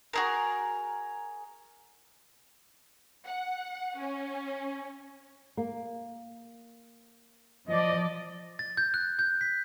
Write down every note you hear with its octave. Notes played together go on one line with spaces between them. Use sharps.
F#4 G#4 A#4
F#5
C#4
A#3
F3 D5 D#5
A6
G6
F#6
G6
B6